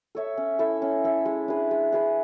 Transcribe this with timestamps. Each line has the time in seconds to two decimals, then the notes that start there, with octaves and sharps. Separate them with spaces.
0.15 A4 C#5 E5
0.37 C#4
0.59 E4 A4 E5
0.82 C#4
1.04 E4 A4 E5
1.25 G#3
1.48 D4 G#4 B4
1.71 G#3
1.92 D4 G#4 B4